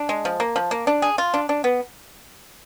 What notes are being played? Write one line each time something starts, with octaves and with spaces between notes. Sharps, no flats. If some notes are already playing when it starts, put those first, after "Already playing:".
Already playing: D4
G#3
F3
A#3
F3
A#3
D4
G#4
F4
D4
D4
B3